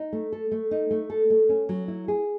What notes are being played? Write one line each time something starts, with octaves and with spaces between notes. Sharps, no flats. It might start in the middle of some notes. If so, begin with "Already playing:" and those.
Already playing: D#4
A3
A4
A3
D#4
A3
A4
A3
C#4
F#3
E4
G#4